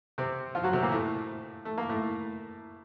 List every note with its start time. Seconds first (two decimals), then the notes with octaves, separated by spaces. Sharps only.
0.18 C3 C4
0.55 F3 F4
0.63 F#3 F#4
0.73 C3 C4
0.82 A#2 A#3
0.92 A2 A3
1.65 A3
1.78 A#3
1.89 A2 A3